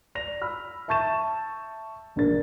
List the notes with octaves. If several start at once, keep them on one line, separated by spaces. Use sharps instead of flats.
D5 A#6 F7
B5 E6 F6
E5 A5 C#6 G6 A6 E7
E1 A#1 D4 A#4 A6